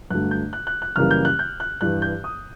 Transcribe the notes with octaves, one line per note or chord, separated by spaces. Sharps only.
G2 D3 F#3 A3 F#6
G6
F#6
F#6
F#6
F#2 C#3 E3 G3 A#3 F6
G6
F#6
G6
F#6
G2 E3 G3 F#6
G6
D#6